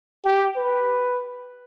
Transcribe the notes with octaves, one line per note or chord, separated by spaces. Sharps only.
G4
B4